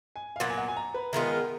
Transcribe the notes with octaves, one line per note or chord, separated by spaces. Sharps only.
G#5
F5
A#2 F#3 B3 F#5
G#5
F#5
G#5
A#5
B4
D#3 G#3 B3 F4 A#4
A#4